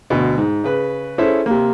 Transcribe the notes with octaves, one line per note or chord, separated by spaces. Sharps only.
D2 B2
G#2
C#3 B4
C#4 E4 G#4 A4 C5 E5
C3 A#3